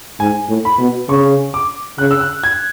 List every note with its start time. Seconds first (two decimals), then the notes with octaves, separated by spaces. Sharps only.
0.20 G#2 G#5
0.49 A2
0.65 B5
0.79 B2
1.09 C#3 C#6
1.54 D6
1.98 C#3 F#6
2.11 E6
2.21 F#6
2.43 G#6